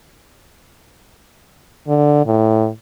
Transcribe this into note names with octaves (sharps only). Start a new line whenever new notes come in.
D3
A2